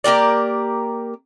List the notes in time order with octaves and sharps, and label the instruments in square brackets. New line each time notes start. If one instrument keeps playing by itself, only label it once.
[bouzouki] A#3 G4 A#4 D5